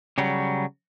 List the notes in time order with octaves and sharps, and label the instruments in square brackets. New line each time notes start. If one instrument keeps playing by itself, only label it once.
[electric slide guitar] C#3 F#3 G3